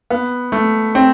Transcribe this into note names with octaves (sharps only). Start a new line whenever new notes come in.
B3
A3
C4